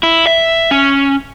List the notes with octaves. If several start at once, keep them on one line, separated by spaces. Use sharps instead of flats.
E4
E5
C#4